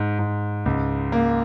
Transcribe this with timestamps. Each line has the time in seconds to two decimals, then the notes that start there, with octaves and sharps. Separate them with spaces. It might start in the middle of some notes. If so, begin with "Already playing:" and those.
Already playing: G#2
0.19 G#2
0.66 C#2
1.12 A#3